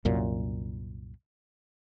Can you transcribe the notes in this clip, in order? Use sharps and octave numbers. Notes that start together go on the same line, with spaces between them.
C2 F#2 A#2